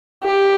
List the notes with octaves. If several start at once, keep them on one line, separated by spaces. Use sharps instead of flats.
G4